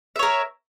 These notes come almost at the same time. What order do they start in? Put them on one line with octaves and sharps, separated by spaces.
E5 C#5 A#4